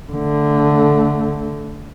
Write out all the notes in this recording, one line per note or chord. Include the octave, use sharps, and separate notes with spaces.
D3 A3